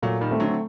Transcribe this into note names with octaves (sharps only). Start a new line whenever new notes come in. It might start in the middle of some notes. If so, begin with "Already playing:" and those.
A#2 F#3 A3
D#3 G3
A3 C4
D3 F#3